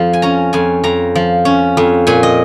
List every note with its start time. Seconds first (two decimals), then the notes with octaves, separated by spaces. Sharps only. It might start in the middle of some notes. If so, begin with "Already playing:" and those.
Already playing: F2 F3 F5
0.13 G#5
0.22 C#4 A#5
0.53 F2 G#5
0.84 F2 A#5
1.15 F3
1.45 C#4
1.77 F2
2.07 A#2 G#5
2.23 D#5